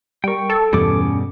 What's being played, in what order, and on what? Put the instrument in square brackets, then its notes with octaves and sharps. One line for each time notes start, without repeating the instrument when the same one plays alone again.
[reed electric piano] G3 A#4 [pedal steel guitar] G5 C#6
[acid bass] A4
[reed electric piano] E2 [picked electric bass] G2 B2 G3 [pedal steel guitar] C#4 D6